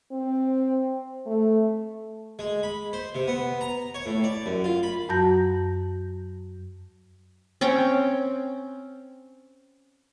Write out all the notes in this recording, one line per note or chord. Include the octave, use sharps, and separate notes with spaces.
C4
A3
G#3
B5
C5
C3
B3
A#5
C#5
A2
D5
F#2
F4
B5
F#2 F#3 F#4 A5 G6 A#6
C4 C#4 C#5 G5